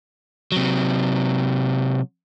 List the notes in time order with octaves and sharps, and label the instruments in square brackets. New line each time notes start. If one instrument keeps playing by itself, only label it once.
[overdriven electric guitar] C3 F#3